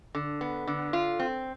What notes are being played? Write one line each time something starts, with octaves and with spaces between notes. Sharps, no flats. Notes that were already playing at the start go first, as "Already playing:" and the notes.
D3
B3
D3
F4
C4